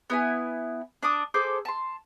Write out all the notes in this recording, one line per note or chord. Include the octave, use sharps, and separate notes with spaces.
B3 E4 G#5
D4 A5 D6 D#6
G#4 A4 C5 D6
A5 C6